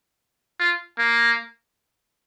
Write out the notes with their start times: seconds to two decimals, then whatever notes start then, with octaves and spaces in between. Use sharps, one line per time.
0.60 F4
0.98 A#3